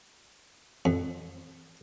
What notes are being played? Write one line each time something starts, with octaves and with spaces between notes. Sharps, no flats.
F2